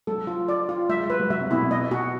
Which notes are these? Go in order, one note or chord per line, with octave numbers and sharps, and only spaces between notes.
F#3 A4
F4
D5
F4
F#3 E5
G#3
G3 B4
F#3
F#3 E5
C3
B2 E4
A#2
B2 D#5
F#4